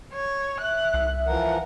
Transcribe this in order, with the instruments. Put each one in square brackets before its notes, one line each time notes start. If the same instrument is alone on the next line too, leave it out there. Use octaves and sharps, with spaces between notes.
[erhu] C#5
[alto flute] E5 [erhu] F#6
[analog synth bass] C2
[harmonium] E3 F3 A#4 [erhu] F#5